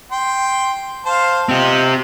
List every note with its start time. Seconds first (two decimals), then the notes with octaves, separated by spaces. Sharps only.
0.12 G5 C6
1.06 C5 F5 A5
1.49 C4 F4 G4 D#5